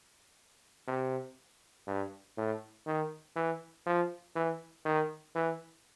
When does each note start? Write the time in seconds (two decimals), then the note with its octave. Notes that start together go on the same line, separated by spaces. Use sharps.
0.87 C3
1.87 G2
2.37 A2
2.86 D#3
3.36 E3
3.86 F3
4.35 E3
4.85 D#3
5.35 E3